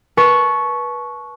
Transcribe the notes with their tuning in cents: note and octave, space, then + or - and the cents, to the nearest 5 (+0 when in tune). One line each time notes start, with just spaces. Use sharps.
B4 -25 A5 -30 C#6 +0